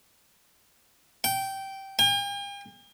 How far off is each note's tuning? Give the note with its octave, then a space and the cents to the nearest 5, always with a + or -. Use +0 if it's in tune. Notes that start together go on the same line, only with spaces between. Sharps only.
G5 -15
G5 +45